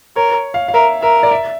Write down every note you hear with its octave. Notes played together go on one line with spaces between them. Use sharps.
A#4 C#5
F5
F5
A#4 E5
A#4 E5
D5
E5